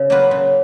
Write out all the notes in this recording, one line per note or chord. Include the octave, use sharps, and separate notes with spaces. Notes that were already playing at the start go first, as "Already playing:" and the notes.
Already playing: C#3
F#3 A#3 F4 B4
C#3